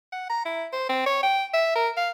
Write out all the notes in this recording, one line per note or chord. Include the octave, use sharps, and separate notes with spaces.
F#5
A#5
E4
C5
C4
C#5
G5
E5
A#4
F5